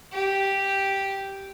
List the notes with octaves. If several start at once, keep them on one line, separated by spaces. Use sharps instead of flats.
G4